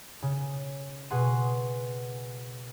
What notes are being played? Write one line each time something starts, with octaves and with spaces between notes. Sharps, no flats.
C#3
B2 G#4 F#5 C6 D#7